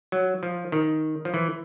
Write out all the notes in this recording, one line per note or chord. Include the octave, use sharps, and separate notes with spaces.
F#3
F3
D#3
F3
E3